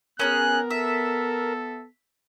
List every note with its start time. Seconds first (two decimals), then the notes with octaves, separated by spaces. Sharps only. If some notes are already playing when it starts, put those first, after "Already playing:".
0.19 B3 C#4 E4 G#4 A#4 F#6
0.71 A4 E5